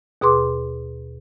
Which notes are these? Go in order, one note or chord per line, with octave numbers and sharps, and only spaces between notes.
D#2 B2 G#4 B4 C6 D6